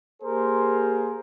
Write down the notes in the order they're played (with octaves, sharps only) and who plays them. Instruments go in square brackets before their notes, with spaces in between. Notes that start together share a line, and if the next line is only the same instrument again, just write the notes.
[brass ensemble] A#3 G4 G#4 A#4 C5